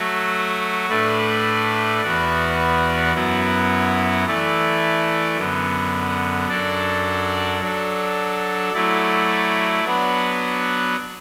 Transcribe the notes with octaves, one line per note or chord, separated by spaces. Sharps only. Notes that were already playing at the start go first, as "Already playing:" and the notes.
Already playing: F#3 A3 F#4
A2 A3 D4 B4 D5
E2 E3 B3 F#4 D5
F#2 F#3 B3 E4
E3 A3 E4 D5
F#2 D3 B3
F#2 F#3 D4 A4 D5
F#3 D4 A4
F#3 A3 E4 D5
F#3 B3 D4 B4